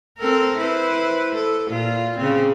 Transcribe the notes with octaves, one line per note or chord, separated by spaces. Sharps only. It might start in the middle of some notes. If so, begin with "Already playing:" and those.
C4 A4 A#4
E4 B4 C5
A4
A#2 F4
C#3 C4